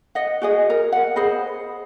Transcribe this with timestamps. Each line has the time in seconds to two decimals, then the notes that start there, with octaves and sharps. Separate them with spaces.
0.15 D#5 F#5
0.42 F#4 G#4 D#5
0.70 A#4
0.92 F#5
1.16 G#4 C5 D#5 B5